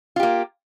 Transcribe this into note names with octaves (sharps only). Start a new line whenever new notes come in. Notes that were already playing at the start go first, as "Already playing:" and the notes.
A#3 F4 G4